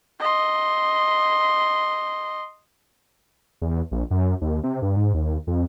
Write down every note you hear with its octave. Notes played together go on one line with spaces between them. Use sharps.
D#5 C6
E2
A#1
F#2
D#2
C3
G2
G#2
D#2
F2